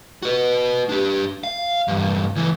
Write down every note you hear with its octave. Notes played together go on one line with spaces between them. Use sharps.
F#4 B4
D4 G4
F5
E2 G2
C#2 E3